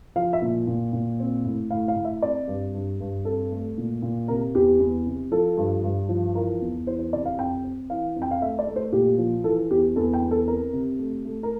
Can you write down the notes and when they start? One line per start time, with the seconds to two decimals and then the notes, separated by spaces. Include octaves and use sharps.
0.16 F3 F5
0.33 E5
0.42 A#2
0.67 A#2
0.93 A#2
1.20 C4
1.45 A2
1.70 A2 F5
1.88 F5
1.96 A2
2.05 E5
2.22 C4 D5
2.48 G2
2.74 G2
3.00 G2
3.25 C4 A4
3.52 A3
3.78 A#2
4.02 A#2
4.28 C3 A#4
4.55 E2 G4
4.80 E2
5.06 C3
5.32 F3 A4
5.57 G2
5.83 G2
6.09 F3
6.35 E3 A#4
6.61 E2
6.86 E3 C5
6.99 C5
7.13 C3 D5
7.26 F5
7.38 F2 G5
7.64 C4
7.89 E3 F5
8.16 F2
8.22 G5
8.31 F5
8.42 A3 E5
8.59 D5
8.67 A3
8.76 C5
8.92 A#2 G4
9.18 F3
9.44 E3 A4
9.71 E2 G4
9.96 E2 A4
10.13 G5
10.22 E2
10.31 A4
10.48 C4 A#4
10.73 C3
10.99 A3
11.25 A3
11.43 A#4